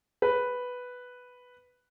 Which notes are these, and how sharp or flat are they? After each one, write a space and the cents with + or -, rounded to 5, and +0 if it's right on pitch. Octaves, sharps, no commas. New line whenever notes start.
B4 +0